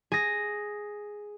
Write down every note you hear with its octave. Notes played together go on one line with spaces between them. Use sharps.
G#4 A#6